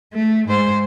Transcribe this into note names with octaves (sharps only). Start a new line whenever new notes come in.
A3
G#2 C5